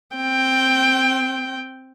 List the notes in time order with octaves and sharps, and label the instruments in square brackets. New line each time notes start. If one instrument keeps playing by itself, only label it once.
[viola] C4 G5